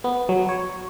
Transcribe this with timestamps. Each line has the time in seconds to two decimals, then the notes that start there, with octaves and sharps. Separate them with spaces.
0.04 B3
0.29 F#3
0.49 C#5